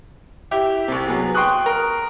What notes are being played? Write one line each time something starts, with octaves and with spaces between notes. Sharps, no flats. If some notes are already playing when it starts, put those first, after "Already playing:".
E4 G4
C2 C3
F#3 B3 G#4
G5 C6 C#6 D#6 F#6
A#4